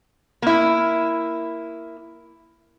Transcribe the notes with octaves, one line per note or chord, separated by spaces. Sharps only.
A#3 E4